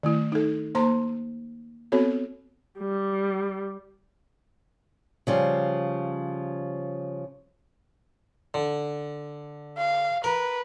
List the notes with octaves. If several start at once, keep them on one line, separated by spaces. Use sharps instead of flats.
D#3 A3 E4
D#4 A4
A#3 C5 A#5 C6
B3 C4 F#4 A4 C#5
G3
C#3 F3 G3
D3
F5
A#4 B4